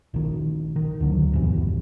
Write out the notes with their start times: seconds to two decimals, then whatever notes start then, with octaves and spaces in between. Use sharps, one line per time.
0.14 A#1 D#3
0.76 D#3
1.00 D2 D3 F#3
1.32 B1 E2 G2 E3